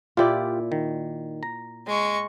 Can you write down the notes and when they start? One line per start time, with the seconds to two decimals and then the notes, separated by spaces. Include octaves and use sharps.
0.17 A#2 E4 F4 G4 D5
0.72 D#3
1.43 A#5
1.87 G#3 C#6